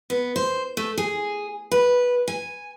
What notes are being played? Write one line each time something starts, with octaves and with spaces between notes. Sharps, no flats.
B3
C5
A3
G#4
B4
G#5